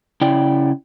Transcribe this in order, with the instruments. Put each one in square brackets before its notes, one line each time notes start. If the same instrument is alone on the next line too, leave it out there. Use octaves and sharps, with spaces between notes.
[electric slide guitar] C#3 E4 D5 G5